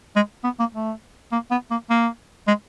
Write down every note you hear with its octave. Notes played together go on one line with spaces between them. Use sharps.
G#3
B3
A#3
A3
A#3
B3
A#3
A#3
G#3